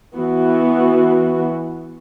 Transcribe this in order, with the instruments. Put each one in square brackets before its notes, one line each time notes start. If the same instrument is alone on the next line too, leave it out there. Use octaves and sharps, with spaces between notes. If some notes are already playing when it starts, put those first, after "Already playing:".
[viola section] E3 B3 F#4